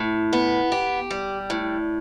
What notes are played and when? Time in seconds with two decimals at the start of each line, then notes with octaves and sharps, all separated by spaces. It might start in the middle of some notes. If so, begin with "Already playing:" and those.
Already playing: A2
0.33 B3
0.72 G4
1.11 G3
1.50 A2